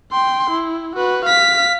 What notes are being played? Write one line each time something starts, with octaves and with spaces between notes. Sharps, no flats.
G5 C6
E4
F#4 B4
F5 B6